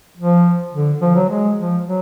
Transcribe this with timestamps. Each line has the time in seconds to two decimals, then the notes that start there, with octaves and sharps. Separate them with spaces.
0.17 F3
0.73 D3
1.01 F3
1.16 F#3
1.29 G#3
1.58 F3
1.85 F#3